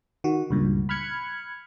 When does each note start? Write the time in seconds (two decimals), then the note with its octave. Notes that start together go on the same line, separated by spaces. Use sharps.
0.24 D#3 F#4
0.51 C#2 G2 A#2
0.89 B5 F6 F#6 G#6 C#7